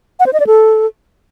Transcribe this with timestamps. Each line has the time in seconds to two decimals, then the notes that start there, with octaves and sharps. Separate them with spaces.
0.20 F#5
0.26 C5
0.33 D#5
0.40 D5
0.47 A4